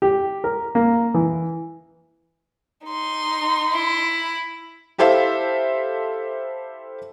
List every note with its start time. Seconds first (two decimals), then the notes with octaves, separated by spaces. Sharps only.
0.02 G4
0.44 A#4
0.75 A#3
1.14 E3
2.86 D#4 C6
3.72 E4
4.98 E4 G4 A4 C5 E5 F5